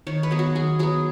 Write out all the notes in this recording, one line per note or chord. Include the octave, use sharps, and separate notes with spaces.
D#3 C#5
B4
F#3 B3 G#4
F#4
D#3 G#4
F#3 B3 G#4